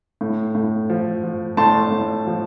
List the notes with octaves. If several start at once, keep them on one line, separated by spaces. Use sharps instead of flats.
A2
A2
F3
F3
A2 A5 C6
A2
F3